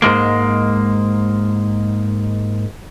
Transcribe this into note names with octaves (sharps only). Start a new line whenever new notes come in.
G#2 G#3 A#3